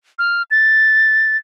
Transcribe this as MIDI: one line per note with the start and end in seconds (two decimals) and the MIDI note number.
0.19 0.43 89
0.51 1.37 93